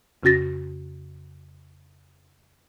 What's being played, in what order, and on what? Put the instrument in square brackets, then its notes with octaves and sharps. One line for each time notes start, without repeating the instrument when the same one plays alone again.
[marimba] F2 C#3 C#4 F#4 A6 A#6